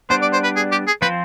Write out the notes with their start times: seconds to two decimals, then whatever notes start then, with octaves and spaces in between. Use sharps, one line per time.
0.10 G3 B3 D4 C5
0.22 D5
0.33 C5
0.44 B4
0.56 G#4
0.72 G4
0.87 G#4
1.02 F3 C4 F4 B4 C5